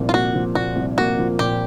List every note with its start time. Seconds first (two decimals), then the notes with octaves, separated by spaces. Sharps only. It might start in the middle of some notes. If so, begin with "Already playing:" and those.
Already playing: C2 A#2 F3 A#3
0.09 F4
0.13 A#3 F#4
0.34 F3
0.55 A#2 F#4
0.76 C2
0.98 A#3 F#4
1.18 F3
1.39 A#2 G4